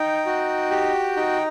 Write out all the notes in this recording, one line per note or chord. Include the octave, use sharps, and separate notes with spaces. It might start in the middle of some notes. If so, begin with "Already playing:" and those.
Already playing: D#4 G5
F#4
G4
D#4